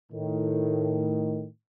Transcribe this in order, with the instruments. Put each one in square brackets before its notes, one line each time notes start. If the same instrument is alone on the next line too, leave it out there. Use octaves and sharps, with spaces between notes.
[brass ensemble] A2 D#3